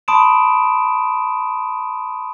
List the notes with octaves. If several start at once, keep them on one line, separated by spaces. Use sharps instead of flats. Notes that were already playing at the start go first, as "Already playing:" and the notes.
A5 B5 C6 D#6 D7 E7